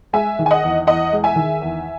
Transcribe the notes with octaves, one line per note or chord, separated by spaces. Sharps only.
G#3 E5 G#5
D#3
G#5
D#5 F#5
E2
E2 D#5 F#5
G#3
E5 G#5
D#3
E2